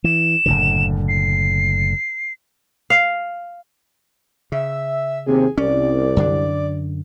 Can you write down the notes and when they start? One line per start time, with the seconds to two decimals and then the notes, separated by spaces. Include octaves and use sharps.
0.04 E3 E7
0.46 F#1 A2 D3
1.08 C7
2.90 F5
4.52 C#3 E5
5.27 D#2 C3 G#4
5.58 C2 C#4 D5
6.16 F#2 D3 D4